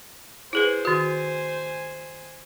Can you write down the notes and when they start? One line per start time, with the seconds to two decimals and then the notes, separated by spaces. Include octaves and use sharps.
0.53 E4 G#4 B4 C5 G#5
0.85 D#3 F#4